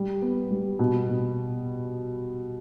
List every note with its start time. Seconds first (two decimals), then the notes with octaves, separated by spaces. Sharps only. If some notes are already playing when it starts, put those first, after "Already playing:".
Already playing: G3
0.22 B3
0.51 G3
0.79 B2
1.08 B2